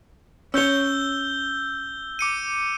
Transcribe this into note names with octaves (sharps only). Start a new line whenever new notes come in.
C#4 C#5 E6 G6 G7
D6 C#7 D#7